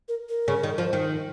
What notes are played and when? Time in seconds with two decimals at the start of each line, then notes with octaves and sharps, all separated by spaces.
0.08 A#4
0.29 A#4
0.48 C#3
0.63 D#3
0.78 F3
0.93 D#3